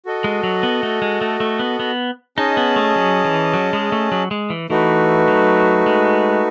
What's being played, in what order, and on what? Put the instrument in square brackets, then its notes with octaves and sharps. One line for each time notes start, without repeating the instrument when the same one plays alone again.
[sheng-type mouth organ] F#4 A4 D#5
[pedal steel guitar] G#3
F#3
B3
A3
G#3
A3
A3
B3
B3
[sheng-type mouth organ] C#4 G#4 D#5 A5 [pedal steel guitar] D#4
[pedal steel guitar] B3
A3
F#3
E3
F#3
G#3
A3
F#3
G#3
E3
[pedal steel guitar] E3 [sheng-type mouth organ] A3 D#4 F#4 B4
[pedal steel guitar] F#3
G#3